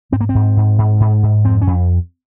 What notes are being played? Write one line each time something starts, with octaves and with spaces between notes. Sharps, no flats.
G#2 C4
A#3
C4
G#2
G#2
G#2
G#2
G#2
F2 C4
C#4
F2